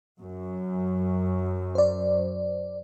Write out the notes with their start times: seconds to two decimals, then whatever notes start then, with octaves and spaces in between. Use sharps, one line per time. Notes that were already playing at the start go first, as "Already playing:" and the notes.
0.19 F#2
1.75 C5 D5